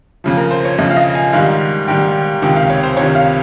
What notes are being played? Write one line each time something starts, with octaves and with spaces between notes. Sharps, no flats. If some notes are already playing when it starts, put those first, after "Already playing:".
F2 C#3 F3
A#4
C5
C#5
F2 C#3 F3 D#5
F5
D#5
G#5
G#2 D#3 G3 F5
G#2 D#3 G3 G5
C#2 C3 D#3 G5
F5
C#5
C5
C#2 C3 D#3 C#5
F5